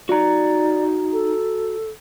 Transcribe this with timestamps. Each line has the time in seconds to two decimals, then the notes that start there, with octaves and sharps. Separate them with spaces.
0.09 D#4 F#4 D5 A#5
1.13 A4